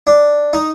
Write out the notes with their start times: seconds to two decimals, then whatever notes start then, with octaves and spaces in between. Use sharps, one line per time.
0.07 D4
0.53 D#4